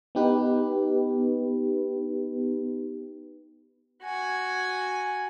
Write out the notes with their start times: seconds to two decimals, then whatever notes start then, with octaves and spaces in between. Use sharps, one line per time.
0.15 B3 D#4 G4 B4
4.03 F#4 G#5